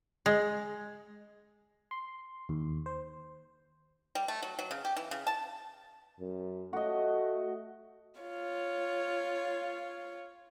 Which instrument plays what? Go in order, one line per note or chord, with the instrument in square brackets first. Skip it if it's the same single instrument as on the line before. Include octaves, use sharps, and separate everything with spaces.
[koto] G#3
[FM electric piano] C6
D#2
C5
[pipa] G3
A3
F#3
F#3
C#3
G4
E3
C#3
A5
[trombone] F#2
[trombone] A3 [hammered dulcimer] F#4 D#5
[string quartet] F4 C#5